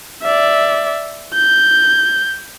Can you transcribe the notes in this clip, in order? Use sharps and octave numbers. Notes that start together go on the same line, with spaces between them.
D5 E5
G6